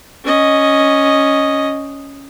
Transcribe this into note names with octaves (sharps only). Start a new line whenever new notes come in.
C#4 D#5